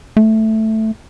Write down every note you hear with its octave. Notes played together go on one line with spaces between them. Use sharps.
A3